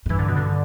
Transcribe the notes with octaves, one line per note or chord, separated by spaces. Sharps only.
A2
G2 E3
D3
B2
D3